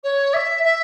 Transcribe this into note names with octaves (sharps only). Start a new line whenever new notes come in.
C#5
E5
E5